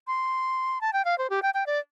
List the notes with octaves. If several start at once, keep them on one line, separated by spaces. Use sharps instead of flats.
C6
A5
G5
F5
C5
G4
G5
G5
D5